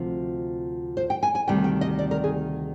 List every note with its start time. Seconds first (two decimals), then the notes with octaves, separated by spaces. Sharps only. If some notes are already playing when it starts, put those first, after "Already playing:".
Already playing: D2 C3 F3
0.97 C5
1.10 G5
1.23 G#5
1.35 G#5
1.48 D2 C3 D#3 G3 G5
1.64 G5
1.81 D#5
1.99 D5
2.11 A#4
2.24 G#4